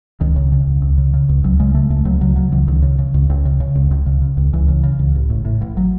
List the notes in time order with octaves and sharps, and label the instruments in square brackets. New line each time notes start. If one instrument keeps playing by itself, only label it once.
[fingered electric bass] C#2 D#3
C#3
C#3
C#2
C#2
C#3
C#3
C#2
C#2 F#3
C#3 G#3
C#3 A3
C#2 A3
C#2 F#3
C#3 F#3
C#3 F#3
C#2 E3
C#2 D#3
C#3
C#3
C#2
C#2
C#3
C#3
C#2
C#2
C#3
C#3
C#2
C#2 E3
C#3
C#3
C#2
A1
A2
A2
A1
F#3